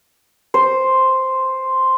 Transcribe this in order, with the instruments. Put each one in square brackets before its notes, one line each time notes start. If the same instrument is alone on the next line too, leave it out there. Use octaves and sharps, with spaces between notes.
[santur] C5